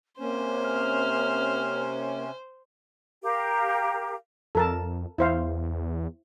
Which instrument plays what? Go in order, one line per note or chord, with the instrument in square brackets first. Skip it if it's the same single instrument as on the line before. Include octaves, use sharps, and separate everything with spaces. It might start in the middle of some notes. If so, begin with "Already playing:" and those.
[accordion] C3 C#4 [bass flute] A#3 [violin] C5
[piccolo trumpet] F6
[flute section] G4 A#4 F5
[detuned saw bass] F2 [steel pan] A4 A#4 A5
[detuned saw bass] E2 [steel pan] E4 C5 F5